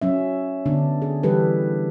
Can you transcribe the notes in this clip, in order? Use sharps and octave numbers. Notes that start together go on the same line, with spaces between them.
F#3 C#4 E5
D3 B3 D4
G#4
E3 G3 G4 A4 B4